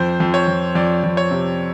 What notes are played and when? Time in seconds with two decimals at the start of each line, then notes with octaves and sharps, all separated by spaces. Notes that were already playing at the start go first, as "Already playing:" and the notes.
Already playing: F2 C5
0.20 F2
0.34 C#5
0.48 F2
0.75 F2 D5
1.03 F2
1.17 C#5
1.31 C3